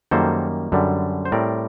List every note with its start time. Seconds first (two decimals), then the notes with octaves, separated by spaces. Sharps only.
0.11 F#2 D#3 G3 A#3 A4 C5
0.72 F#2 D3 G3
1.25 C5
1.32 A2 G3 C4 A#4 D5